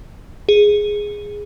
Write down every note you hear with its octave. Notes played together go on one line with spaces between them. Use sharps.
G#4